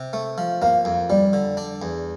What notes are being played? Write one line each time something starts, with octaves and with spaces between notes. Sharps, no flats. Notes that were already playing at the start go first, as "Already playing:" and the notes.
Already playing: C3
A3
F3
A#3 F5
F2
G3 D5
D3
D4
E2